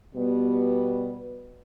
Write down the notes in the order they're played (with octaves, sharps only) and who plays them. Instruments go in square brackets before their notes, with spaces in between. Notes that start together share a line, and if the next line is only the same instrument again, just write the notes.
[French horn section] B2 G3 B3